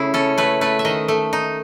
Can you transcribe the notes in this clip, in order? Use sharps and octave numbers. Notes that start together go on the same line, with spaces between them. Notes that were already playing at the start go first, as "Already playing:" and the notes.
Already playing: C#3 A3 E4
C#4 A4
A3 B4
A3 B4
E5
D#3 D#5
A3
D#4